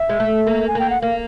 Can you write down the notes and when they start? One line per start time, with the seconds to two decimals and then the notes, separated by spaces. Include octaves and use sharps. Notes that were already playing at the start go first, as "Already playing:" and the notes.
Already playing: E5
0.09 G#3
0.20 A3
0.47 A#3
0.68 G#5
0.75 A#3 G5
0.90 F#5
1.01 A#3 F5